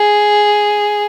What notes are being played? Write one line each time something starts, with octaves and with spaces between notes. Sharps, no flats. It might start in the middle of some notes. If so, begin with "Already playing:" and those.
Already playing: G#4